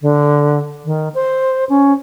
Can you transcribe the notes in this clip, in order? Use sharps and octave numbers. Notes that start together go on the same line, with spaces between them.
D3
D#3
C5
C#4